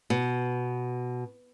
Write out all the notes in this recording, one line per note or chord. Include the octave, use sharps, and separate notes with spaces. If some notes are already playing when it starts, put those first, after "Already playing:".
B2